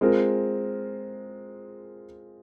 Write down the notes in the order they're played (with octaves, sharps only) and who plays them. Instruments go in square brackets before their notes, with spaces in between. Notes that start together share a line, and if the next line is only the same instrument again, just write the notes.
[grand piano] G#3 C4 F4 A#4